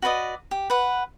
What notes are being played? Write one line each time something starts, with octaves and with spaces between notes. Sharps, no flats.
F#4 B4 D5 D#5
G4
B4 F#5